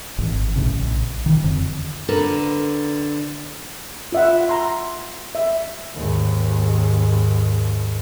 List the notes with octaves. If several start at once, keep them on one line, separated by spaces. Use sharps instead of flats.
G#1 E3
B1 A2 C#3
A#1
D#3 E3
E1 F2 D3
D3 A#4 B4
F4 E5 F#5
A#5 C6
E5
D#2 G#2